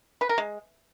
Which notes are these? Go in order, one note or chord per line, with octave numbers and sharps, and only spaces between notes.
B4
A#4
G#3